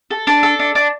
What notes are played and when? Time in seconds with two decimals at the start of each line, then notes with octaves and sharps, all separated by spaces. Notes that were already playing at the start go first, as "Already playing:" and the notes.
0.11 A4
0.27 D4
0.43 A4
0.59 D4
0.75 D4